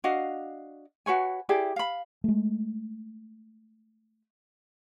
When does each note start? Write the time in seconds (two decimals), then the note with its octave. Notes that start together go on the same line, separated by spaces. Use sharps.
0.04 D4 F#4 D#5 F5
1.06 F#4 B4 C#5 G#5
1.49 E4 G4 G#4 D5
1.76 F5 B5
2.24 G#3 A3